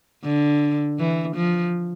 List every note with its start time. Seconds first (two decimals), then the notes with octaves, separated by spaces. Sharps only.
0.24 D3
0.99 E3
1.36 F3